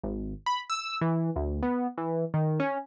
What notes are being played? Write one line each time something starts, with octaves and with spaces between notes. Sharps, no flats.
G#1
B5
E6
E3
D2
B3
E3
D#3
C#4